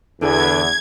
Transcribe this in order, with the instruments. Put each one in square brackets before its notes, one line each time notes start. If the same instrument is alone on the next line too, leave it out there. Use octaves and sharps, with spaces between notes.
[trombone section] E2 [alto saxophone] D3 [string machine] G#6